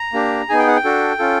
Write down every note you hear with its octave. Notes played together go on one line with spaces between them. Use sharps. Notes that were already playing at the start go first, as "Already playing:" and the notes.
Already playing: A#5
A#3 D4 G4
B3 D#4 G#4 G#5
G5
F#5
G5
D4 F#4 A4
C#4 F4 A4